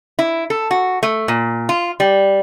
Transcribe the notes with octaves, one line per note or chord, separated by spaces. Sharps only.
E4
A4
F#4
A3
A#2
F4
G3